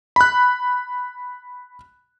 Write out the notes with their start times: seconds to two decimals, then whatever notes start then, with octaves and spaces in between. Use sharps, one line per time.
0.16 B5 F#6